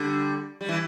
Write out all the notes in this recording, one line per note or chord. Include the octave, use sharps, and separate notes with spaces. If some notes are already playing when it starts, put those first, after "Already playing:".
Already playing: D3 G3
G3
E3